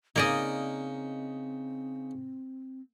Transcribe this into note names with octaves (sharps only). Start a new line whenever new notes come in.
C#3 A#3 C4 D#4 D5 D#5